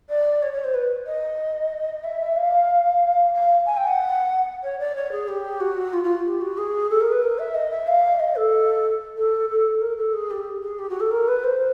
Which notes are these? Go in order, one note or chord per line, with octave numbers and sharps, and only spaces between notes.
D5
C#5
C#5
C5
B4
D#5
E5
F5
F5
G#5
G5
F#5
C#5
D5
C#5
G#4
G4
F#4
F4
F4
G4
F#4
G#4
A4
A#4
B4
A#4
E5
D#5
E5
F5
D#5
A4
A4
A4
A#4
A4
G#4
G4
G#4
G4
F#4
A4
A#4
B4
C5